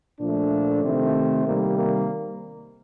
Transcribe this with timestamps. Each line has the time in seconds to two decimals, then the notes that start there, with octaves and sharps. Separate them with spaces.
0.20 A#2 F3 A3 D4
0.82 C3 D#3 A3 C4
1.45 C3 D#3 G3 A#3
1.76 A#3